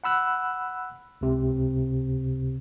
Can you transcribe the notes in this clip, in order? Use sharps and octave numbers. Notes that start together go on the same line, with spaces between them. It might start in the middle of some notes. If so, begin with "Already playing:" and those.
F#5 B5 E6 F#6
C#2 C3